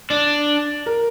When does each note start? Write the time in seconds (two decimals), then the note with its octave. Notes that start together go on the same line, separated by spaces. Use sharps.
0.10 D4 D5
0.86 A#4